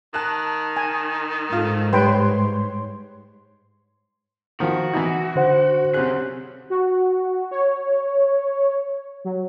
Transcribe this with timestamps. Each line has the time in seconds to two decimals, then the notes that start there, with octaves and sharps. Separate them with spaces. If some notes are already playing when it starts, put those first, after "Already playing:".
0.14 D#3 A5 F#6
0.77 G#5
1.52 G#2 F4 A4
1.93 G3 B4 C#5 G5 C6
4.60 D#3 F3 F#4
4.93 E3 D#4 E4
5.36 D3 C5 F#5
5.94 C3 C4 C#4 G#4 F#6
6.70 F#4
7.51 C#5
9.25 F#3